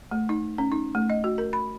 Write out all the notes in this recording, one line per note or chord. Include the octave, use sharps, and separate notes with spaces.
A3
D#4
C#4
D#4
A3
D#5
F#4
A#4
B5